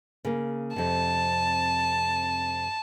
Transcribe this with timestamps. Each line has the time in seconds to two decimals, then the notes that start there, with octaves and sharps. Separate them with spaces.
0.25 C#3 A#3
0.76 F2 C3 A5